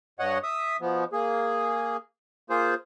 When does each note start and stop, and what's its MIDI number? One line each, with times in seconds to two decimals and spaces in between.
0.19 0.38 43
0.19 0.38 73
0.19 0.38 75
0.19 0.38 78
0.43 0.77 76
0.43 0.77 87
0.81 1.04 47
0.81 1.04 53
0.81 1.04 59
1.13 1.97 58
1.13 1.97 68
2.50 2.74 58
2.50 2.74 65
2.50 2.74 68
2.50 2.74 72